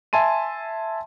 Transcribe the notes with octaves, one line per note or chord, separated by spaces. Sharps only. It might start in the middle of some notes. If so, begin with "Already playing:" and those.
E5 G#5 A5 C6 D#7